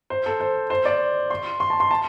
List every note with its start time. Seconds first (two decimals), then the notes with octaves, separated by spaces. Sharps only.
0.10 C5
0.26 A4
0.40 C5
0.70 C5
0.85 D5
1.30 C6
1.60 C6
1.70 A5
1.80 C6
1.91 A5